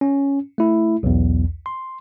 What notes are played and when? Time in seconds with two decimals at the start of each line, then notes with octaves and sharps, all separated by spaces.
0.01 C#4
0.58 A3 E4
1.03 B1 E2
1.66 C6